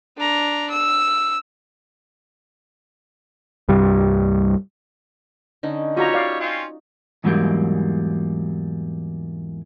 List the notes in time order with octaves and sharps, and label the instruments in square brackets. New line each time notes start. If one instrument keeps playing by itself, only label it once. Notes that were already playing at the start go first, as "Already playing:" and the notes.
[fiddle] D4 A#5
E6
[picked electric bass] C2 G2 G3
[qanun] D3 C#4 D#4
[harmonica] G3 C#5 [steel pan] F4 F#4 A#5 [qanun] D#5
[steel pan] D5 F5
[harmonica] C4 C#4 F4
[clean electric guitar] E2 G#2 E3 F#3 G3 A#3